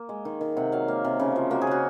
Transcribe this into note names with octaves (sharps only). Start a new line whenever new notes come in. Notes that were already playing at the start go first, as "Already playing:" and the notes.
Already playing: A#3
G#3
D#3
D#3
C3 F#5
F#3 F5
A#3
C3
C#3
F3
A#3 F#4
G#4
C#3 F#4